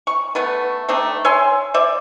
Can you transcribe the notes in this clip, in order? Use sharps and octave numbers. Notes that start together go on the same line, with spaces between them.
C#6
A3 B3 B4
A3 C4 D4 D#4
C#5 E5 G#5 C6
C5 D5 E5